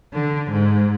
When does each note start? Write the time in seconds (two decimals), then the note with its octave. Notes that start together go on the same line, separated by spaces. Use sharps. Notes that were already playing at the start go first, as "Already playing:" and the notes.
0.13 D3
0.50 G#2